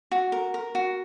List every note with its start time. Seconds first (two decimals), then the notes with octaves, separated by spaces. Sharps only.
0.11 F#4
0.32 A#4
0.54 A#4
0.75 F#4